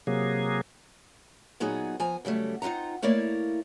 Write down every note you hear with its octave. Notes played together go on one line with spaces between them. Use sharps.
C3 F#3 A#3 G#4
A#2 F#3 B3 D#4 G#4
F3 G#5 A#5
C#3 F#3 G3 A3
C4 D#4 F4 F#5 A#5
A3 A#3 E4 A#4 C#5 D5